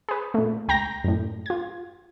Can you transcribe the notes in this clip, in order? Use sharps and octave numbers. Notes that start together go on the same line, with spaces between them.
G#4 B4
A#2 A3
C#2 G5 A#5 G6 A#6
F#2 A2
F4 G#6